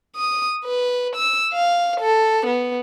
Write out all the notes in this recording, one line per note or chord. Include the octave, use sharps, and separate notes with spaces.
D#6
B4
E6
F5
A4
B3